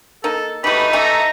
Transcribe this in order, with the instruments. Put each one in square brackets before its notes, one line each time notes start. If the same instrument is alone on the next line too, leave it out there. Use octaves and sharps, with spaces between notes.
[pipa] A#3 D#4 [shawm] A4
[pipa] E3 A3 [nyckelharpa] D#4 [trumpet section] F#4 G4 B4 [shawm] B5
[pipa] E3 A3 G#5 [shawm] E5 [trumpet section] A#5